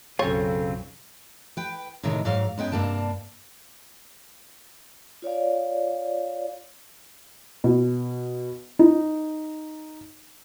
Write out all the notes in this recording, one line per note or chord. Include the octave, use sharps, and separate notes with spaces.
B1 F#2 C#3 F#3 C4 F4 A4 C#5
B4 G5
A2 C3 D#3 G#3
G#2 F#3 F5
F#2 G#3 B3 G5
G2 C3 A#3 D4 A5
F4 C#5 D5 F5
B2
D#4